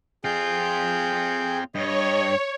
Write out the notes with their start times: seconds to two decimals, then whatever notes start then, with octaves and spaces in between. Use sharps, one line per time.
0.24 C4 F4 G#4 G5
1.75 G2 C#5 D#5